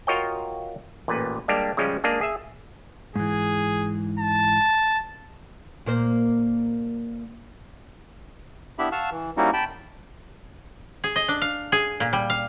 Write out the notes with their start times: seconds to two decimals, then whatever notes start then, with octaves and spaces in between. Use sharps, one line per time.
0.07 F4 F#4 A#4 C#5 D#5 G5
1.08 A1 A#2 B4
1.48 G3 G#3 A#3 D4 G4
1.77 C#3 F3 G3 G#3 C#4
2.04 G#3 A#3 D4 G#4
2.21 G#4 E5
3.16 G#2 E3 G#4
4.19 A5
5.86 A#2 A#3 C5
8.79 B3 D4 E4 G4 E5 B5
8.92 F5 F#5 A5 C#6 E6 F6
9.11 E3
9.37 G3 A#3 C#4 D#4 E4 F#4
9.53 G5 A5 B5
11.04 G#4
11.16 D#5
11.28 D4
11.42 F5
11.72 G#4
12.00 A#2
12.13 G3
12.30 F5